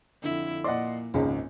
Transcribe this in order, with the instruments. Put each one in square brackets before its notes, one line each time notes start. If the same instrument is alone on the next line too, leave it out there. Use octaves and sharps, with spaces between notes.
[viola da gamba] F2 E4 [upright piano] D3
[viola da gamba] A#2 [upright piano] D5 D#5 F#5 [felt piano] C6 D6
[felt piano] G#1 G#2 C#3 [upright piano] C#2 [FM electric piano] C#4 G#4